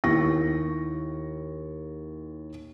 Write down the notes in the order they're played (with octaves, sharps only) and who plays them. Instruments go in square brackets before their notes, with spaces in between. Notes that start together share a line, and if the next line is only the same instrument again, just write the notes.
[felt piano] D#2 E4 C#6 A#6